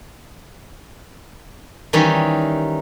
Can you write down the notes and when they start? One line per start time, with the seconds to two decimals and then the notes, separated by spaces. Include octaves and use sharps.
1.93 D#3 E3 G3 C#4 D#4